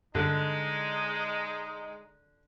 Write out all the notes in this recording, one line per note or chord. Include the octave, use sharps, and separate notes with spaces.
G2 D3 G#3 D#4